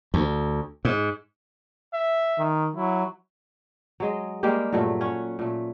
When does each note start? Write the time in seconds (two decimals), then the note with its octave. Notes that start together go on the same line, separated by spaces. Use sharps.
0.14 D2
0.85 G#2
1.94 E5
2.39 D#3
2.76 F#3 E4
4.00 F#3 G#3 D#5
4.43 G3 G#3 A#3 G4
4.72 G2 A#2 F#3 A3
5.01 C#4 C#5 F#5
5.39 A#2 A3